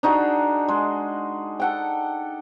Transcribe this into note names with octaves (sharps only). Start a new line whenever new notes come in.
D4 D#4 F#4 G#4
G#3
A4 F#5 G5